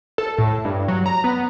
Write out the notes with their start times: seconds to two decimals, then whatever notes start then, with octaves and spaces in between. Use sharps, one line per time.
0.18 A4
0.38 A2
0.65 G2
0.88 F#3
1.06 A#5
1.24 B3